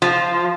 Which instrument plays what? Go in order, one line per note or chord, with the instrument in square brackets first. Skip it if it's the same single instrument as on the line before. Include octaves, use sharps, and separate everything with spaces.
[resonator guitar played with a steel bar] F3